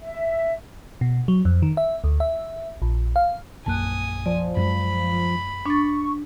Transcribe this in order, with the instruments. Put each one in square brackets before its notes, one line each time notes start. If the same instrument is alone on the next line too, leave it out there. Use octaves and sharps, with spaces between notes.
[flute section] E5
[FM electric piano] B2
F#3
F2
D#3
E5
D2
E5
A#1
F5
[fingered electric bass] A#1 F#2 A#3 [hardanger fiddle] G#5 D#6 [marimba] A5 F#6
[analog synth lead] F3 [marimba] D5
[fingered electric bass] F#2 F#3 G#3 [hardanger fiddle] B5
[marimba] D4 A6 [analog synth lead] C#6